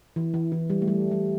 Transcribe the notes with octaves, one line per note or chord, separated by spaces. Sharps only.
E3
E3
E3
G3
A3
G3
G3